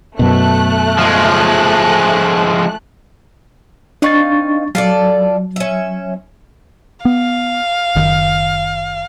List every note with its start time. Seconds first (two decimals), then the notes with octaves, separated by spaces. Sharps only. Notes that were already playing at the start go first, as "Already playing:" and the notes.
0.19 F#2 B2 A3 F#6
0.99 F3 G#3
4.02 C4 D4 D#4 F5 C#6 A6
4.75 F#3 F4 A4 D5
5.56 C#4 E5
7.05 B3 F5
7.95 F#1 D#3